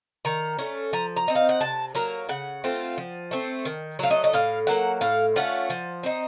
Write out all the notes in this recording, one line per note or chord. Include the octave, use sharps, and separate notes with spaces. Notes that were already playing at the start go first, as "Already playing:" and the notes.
D#3 A#5
A3 C#4
F3 A#5
A#5
C4 D#4
F5
F#5
C3 A5
F#3 A#3 A#5
C#3 F#5
A3 C4 F4
F3
A3 C4
D#3
F#3 A3 F5
D#5
D#5
A2 F5
F#3 A#3 F#5
A2 F5
A3 C#4 F4 F#5
F3
C4 D#4